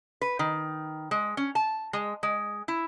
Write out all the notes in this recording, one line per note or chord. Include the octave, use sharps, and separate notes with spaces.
B4
D#3
G#3
C#4
A5
G#3
G#3
E4